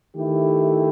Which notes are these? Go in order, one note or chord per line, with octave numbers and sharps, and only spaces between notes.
D#3 A3 E4 G4